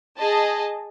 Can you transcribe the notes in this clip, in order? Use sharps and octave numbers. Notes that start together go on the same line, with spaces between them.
G#4 D#5 A5